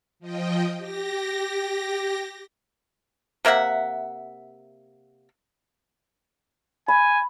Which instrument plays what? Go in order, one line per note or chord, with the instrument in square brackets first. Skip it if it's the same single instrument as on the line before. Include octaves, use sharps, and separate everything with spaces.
[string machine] F3 D#5 G5
G4 A#6
[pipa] C3 A#3 E5 F#5
[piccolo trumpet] G#5 [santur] B5